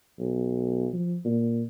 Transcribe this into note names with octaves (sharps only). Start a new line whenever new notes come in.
B1
F3
A#2